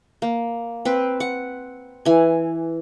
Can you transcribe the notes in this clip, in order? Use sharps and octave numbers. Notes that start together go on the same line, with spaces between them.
A#3
C4 B4
F#5
E3 G#5